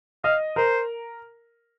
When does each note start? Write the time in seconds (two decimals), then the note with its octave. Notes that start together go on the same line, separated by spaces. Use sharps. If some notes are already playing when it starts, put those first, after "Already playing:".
0.24 D#5 F5
0.56 A#4 C5